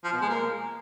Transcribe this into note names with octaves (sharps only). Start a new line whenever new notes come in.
F3
B2
G#3
A#3